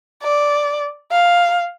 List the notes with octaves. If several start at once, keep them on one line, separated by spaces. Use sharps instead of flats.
D5
F5